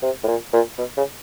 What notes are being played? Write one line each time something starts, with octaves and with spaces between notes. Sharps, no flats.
C3
A2
A#2
A#2
B2
C#3